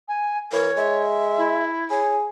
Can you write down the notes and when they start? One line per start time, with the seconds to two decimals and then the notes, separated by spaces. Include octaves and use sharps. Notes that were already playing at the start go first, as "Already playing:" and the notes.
0.08 G#5
0.52 E3 A#4 C#5
0.77 G#3 E5
1.38 E4
1.90 G#4 C#5